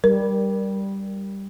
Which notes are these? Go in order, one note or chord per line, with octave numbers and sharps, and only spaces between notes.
G3 A#4